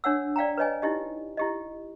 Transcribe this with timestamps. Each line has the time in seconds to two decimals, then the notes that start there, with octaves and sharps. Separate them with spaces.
0.04 D4 C#5 F#5 E6
0.36 D5 F5 G5 A#5
0.57 B4 C#5 D#5 G#5
0.82 D#4 E4 G4 D#5
1.37 E4 G4 D#5